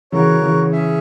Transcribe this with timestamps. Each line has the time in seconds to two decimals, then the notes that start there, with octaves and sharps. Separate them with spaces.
0.12 C#3 E3 F#4 A#4 C#5
0.42 C#3 E3
0.72 C#4 G#4 C#5 E5